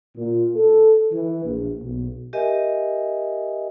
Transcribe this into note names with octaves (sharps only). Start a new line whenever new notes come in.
A#2
A4
E3
A#1
B1
G4 A#4 D#5 E5 G#5